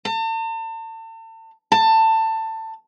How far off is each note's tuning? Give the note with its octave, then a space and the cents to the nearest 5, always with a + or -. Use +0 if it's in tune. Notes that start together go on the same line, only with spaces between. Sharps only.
A5 +40
A5 +20